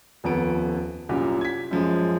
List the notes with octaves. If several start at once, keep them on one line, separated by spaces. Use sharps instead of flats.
D#1 F2 B3 D7
C2 F#2 A#2 G4
G#6 B6
F#2 F3 G#3